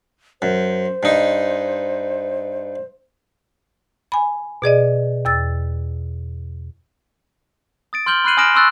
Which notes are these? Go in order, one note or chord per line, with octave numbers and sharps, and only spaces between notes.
F#2 C5
G2 D#4
G#5 B5
B2 G#4 D5 D#5
E2 E6 A6
D#6 A6 D7
C6 F6 G6 F#7 G7
B5 F6 F#6 C7 D#7 F#7
G#5 D#6 F6 A#6 D7 E7
C6 C#6 E6 F#6 A6